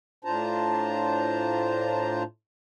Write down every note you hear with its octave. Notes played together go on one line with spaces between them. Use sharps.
A2 D4 F4 C5 A5 A#5